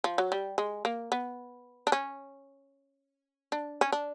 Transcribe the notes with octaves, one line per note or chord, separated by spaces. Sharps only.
F3
F#3
G3
G#3
A#3
B3
D4
C#4
D4
C#4
D4